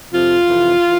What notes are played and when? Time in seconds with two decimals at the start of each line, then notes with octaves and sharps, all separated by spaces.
0.11 F2 C3 F3 F4
0.46 F2 C3 E3
0.84 E3